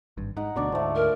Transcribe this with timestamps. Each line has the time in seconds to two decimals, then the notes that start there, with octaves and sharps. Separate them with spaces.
0.17 G#1 G2
0.37 G#2 D#4 F#5
0.56 D2 B2 D4 D5 C#6
0.72 D2 G#2 F3 A3
0.95 A#4